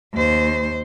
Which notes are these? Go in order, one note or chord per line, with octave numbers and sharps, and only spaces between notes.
D#2 C5